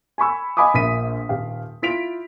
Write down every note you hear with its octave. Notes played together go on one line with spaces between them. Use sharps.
G#5 B5 C#6 E6
D#5 F5 G#5 B5 D6 D#6
A#1 A#2 E5 B6 D#7
D#1 G4 F5
E4 F4 B6 D7 F7